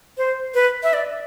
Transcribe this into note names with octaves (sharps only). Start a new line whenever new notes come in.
C5
B4
E5
D5